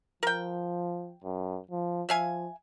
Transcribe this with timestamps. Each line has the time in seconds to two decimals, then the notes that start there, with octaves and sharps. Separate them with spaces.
0.23 F3 A#4 G5
1.24 F#2
1.71 F3
2.09 F3 E5 F5 G#5